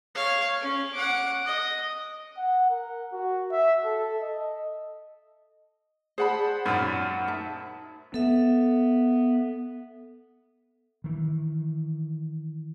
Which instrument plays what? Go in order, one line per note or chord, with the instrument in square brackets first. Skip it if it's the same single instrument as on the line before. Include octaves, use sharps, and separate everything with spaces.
[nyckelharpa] C#5 F5
C#4
F#5 D6
D#5
[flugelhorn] F#5
A#4
F#4
E5
A4
D#5
[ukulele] G#4 D5 A5 [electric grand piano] C5 F#5 B5
[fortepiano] F#2 A#2 [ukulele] C#4 D#4
[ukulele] D#4 E5 A5
[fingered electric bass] B3 [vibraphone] A4 E5
[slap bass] D#3 E3